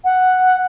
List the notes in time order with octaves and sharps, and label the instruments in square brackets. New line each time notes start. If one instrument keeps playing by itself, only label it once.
[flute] F#5